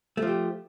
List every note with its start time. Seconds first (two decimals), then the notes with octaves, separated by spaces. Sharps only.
0.17 A3
0.22 F3
0.27 G4